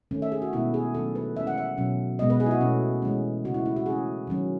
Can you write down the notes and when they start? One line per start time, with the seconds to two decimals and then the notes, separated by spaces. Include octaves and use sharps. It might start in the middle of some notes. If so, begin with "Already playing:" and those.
0.11 D#3 A3 C#4
0.22 E5
0.32 G#4
0.42 F#4
0.53 B2 G#3 B3 E4
0.74 G#4
0.94 D#3 F#3 A3 C#4 A4
1.15 B4
1.36 E3 G#3 C#4 E5
1.47 F#5
1.58 E5
1.77 B2 F#3 C#4
2.19 B2 G#3 B3 D#5
2.30 B4
2.40 G#4
2.46 E4
2.51 F#4
2.61 B2 A3 C#4
3.02 E3 G#3 C#4
3.45 C#3 E3 A3 F#4
3.54 E4
3.66 E4
3.76 F#4
3.86 E3 A3 C#4 G#4
4.27 D#3 F#3 C#4